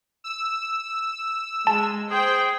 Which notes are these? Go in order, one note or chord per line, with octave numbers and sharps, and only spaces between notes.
E6
G#3 A5
G#4 C5 G5